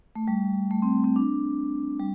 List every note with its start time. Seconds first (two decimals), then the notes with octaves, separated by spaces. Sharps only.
0.15 A3
0.28 G3
0.71 A3
0.82 C4
1.04 C4
1.16 D4
1.99 G3